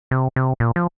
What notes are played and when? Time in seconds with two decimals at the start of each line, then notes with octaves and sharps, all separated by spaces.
0.11 C3
0.36 C3
0.60 A#2
0.76 F3